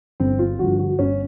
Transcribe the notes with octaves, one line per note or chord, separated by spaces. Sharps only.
G1 C4
F4
G2 D3 F3 F#4
F#4
G1 C#4